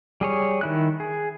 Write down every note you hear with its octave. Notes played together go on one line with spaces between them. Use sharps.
G3 G#4 C#5
D#3 E4 F#6
G#4